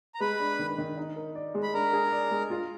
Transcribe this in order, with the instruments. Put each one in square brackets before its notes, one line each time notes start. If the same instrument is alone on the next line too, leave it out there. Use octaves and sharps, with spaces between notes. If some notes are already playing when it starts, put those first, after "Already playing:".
[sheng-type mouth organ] A#5
[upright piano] G#3 [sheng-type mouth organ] B4 B5
[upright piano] D4
D#3
D#3
D#4
A#4
D5
G#3
[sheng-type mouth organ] B5
[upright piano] D4 [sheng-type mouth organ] A#4 A#5
[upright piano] G#4
D5
G#3
F4